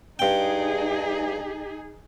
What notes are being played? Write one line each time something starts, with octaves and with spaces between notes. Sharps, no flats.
G2 D#4 G#4 G5